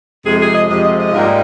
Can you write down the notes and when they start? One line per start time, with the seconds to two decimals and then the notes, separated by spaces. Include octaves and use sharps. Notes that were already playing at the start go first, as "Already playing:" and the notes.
0.25 F2 C3 F3 G#3 G#4
0.40 G#4
0.54 D#5
0.69 F2 C3 F3 G#3 D#5
0.84 D#5
0.99 D#5
1.13 G#2 G3 A#3 F4